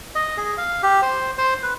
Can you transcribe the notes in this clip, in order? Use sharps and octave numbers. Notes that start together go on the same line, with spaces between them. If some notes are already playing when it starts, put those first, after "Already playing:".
D#5
G#4
F5
G4
C5
C5
B4